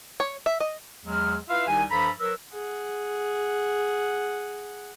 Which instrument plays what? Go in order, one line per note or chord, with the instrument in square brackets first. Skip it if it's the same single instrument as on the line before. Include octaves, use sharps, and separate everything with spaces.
[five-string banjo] C#5
E5
D#5
[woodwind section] E2 F#3 G#3 F6
E4 F4 B4 E5 F5
C2 D#3 D#4 G4 G#5
G2 F3 A4 A#5 B5
F#3 A#4 B4 E6
[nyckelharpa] G#4 F#5